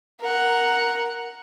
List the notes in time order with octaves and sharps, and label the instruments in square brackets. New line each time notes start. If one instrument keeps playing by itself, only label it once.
[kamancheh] A#4 F#5